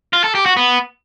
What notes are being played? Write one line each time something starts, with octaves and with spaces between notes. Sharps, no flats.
F4
A4
G4
F#4
B3